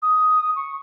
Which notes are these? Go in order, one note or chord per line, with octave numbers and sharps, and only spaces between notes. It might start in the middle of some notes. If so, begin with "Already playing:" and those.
D#6
C#6